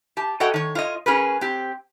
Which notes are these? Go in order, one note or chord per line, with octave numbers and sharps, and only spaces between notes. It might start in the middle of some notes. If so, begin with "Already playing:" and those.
G4 A5
F#4 A4 C#5 D#5 F#5 G5
D#3 C#5
F4 C#5 D#5
C#4 G#4 A#4 B4
C4 G4